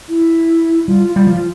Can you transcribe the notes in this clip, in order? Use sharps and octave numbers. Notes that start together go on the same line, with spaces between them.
E4
G3 F4
F4
G3
F3 F4